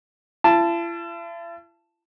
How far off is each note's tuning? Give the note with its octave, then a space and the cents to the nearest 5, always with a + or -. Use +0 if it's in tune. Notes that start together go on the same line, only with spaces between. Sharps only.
E4 +45 A5 +0